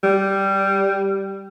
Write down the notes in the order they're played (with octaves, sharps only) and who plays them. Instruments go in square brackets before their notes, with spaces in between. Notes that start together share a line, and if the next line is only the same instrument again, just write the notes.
[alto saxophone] G3